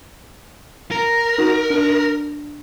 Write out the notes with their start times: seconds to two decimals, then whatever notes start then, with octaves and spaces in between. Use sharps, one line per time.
0.91 A#4
1.38 D#4 F#4
1.70 D4